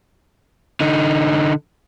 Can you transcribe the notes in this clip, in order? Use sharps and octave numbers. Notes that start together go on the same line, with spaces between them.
D3 D#4